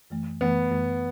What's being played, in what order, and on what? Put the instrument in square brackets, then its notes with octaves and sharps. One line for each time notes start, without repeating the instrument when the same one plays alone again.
[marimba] F#2 E3 A3
[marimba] F#2 E3 A3 [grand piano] B3
[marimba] F#2 E3 A3